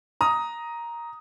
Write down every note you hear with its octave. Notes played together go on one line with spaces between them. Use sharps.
A#5 D#6